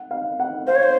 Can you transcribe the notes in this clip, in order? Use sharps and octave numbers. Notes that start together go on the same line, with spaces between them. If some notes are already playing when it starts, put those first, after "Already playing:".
Already playing: F#5
F5
F#5
C5 F5
C#5
C5